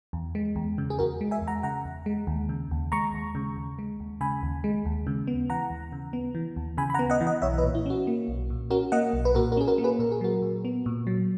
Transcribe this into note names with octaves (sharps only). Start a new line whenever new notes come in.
E2
G#3
E2
C#3
G#4
E2 F#4 A#4
G#3
E5 G#5
E2
F#5 A#5
C#3 F#5 A#5
E2
G#3
D#2
C#3
D#2
G#3 A#5 C#6
D#2
C#3
D#2
G#3
D#2
C#3 G#5 B5
D#2
G#3
D#2
C#3
B3
E3 F#5 A#5
D#2
C#3
B3
E3
D#2
C#3 G#5 B5
B5
F#5 A#5
B3
D#5 F#5
E3
D#5 F#5
B1 C#5 E5
B4 D#5
A#2
E4
C#4 F#4
A#3
B1
A#2
C#4 F#4 A#4
A#3 D#5 F#5
B1
B4
A#2 F#4 A#4
F#4 A#4
C#4 G#4
F#4 A#4
A#3
G#4 B4
A#2 A#4
G#4
F#3 F#4 A#4
A#2
B3
A#2
F#3